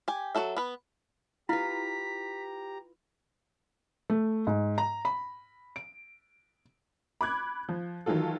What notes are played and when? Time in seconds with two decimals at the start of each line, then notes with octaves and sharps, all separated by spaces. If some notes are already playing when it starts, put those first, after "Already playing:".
0.08 G4 G#5
0.35 F#3 C#4 F#4 A4 E5
0.57 B3 B4
1.49 E4 F4 G4 B4 A#5 B6
4.10 A3
4.47 G#2
4.78 A#5
5.05 B5
5.76 D7
7.21 B5 D6 F#6 G#6
7.69 F3
8.06 D#3 E3 F#3 F4 A4